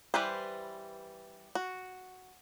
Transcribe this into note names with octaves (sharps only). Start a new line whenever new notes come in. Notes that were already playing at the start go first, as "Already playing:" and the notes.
E3 G3 B4 C5
F#4